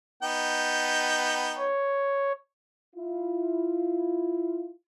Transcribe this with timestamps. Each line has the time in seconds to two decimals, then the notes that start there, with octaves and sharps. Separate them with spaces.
0.23 B3 D#4 G5
1.57 C#5
2.96 E4 F4